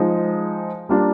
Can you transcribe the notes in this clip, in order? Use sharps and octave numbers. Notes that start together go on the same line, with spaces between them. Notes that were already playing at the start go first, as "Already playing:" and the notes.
Already playing: F3 G#3 D#4
G3 A#3 D4 F4